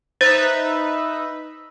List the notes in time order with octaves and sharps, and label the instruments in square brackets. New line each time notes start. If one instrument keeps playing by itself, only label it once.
[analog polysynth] D#4 B4 E5 [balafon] C5